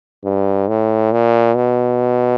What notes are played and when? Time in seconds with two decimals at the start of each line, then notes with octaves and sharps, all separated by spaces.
0.24 G2
0.68 A2
1.12 A#2
1.55 B2